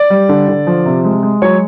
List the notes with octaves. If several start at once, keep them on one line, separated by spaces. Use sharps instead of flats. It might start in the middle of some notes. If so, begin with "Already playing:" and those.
Already playing: D5
G3
D3
D3
F3
C3
G#3
G#3
F#3 C#5